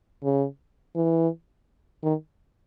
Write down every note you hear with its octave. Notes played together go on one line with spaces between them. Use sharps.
C#3
E3
D#3